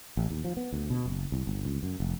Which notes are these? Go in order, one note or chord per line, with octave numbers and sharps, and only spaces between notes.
A1
D#2
F3
B3
D2
B2
F#1
C2
G1
C#2
F#2
F1